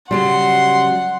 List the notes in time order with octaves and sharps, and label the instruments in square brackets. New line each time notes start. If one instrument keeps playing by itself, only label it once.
[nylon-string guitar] C#3 F#3 G3 [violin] F#5 [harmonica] C6